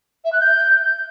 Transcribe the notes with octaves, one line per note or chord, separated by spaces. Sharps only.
E5
F#6
G6